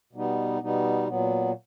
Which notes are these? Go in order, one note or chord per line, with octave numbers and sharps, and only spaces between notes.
B2 G3 B3 D#4
B2 G3 B3 D#4
A#2 F#3 B3